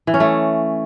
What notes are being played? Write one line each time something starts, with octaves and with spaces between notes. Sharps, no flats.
E3
C#4
A3